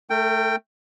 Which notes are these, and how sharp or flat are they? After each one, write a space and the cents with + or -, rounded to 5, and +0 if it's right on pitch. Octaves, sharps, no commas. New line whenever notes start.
A3 +0 A#4 -45 G5 +0